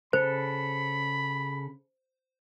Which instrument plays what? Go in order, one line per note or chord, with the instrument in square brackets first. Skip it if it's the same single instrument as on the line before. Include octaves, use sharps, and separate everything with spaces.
[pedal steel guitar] C#3 A4 [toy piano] C5 [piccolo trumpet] B5